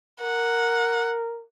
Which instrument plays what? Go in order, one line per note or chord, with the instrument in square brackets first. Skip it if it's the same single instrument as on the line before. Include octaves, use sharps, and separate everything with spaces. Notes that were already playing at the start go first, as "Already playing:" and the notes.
[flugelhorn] A#4 [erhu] F#5